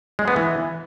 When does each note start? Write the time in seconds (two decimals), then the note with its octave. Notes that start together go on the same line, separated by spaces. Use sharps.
0.19 G#3
0.28 B3
0.36 E3